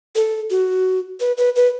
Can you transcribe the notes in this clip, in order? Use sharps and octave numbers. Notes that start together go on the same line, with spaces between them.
A4
F#4
B4
B4
B4